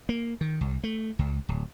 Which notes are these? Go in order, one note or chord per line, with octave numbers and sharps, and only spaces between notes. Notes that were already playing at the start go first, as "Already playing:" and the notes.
A#3
D#3
C2
A3
C#2
D1